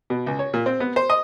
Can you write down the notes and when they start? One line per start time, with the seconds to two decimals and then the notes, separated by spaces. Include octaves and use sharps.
0.10 B2
0.26 C#2
0.39 C#5
0.54 A#2
0.66 C4
0.80 B3
0.96 C5
1.10 D#5